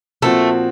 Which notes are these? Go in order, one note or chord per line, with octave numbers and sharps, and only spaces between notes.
A#2 F3 A3 C4 F#4